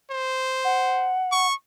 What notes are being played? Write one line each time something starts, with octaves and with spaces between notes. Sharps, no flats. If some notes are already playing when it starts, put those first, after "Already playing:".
C5
F#5
C#6